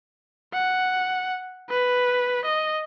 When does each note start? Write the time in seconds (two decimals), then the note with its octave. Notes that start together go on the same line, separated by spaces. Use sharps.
0.54 F#5
1.70 B4
2.46 D#5